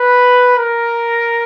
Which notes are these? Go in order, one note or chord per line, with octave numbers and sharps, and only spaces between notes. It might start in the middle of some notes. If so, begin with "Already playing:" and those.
Already playing: B4
A#4